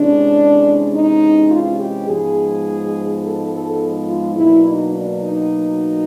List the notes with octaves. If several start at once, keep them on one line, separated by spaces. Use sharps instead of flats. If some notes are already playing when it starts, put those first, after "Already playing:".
Already playing: C3 E3 G#3 C#4 D4
D#4
F4
G4
G#2 F3 G#3 B3 G#4
A4
A4
F4
B2 F#3 A#3 D4 E4
D#4
D4
D#4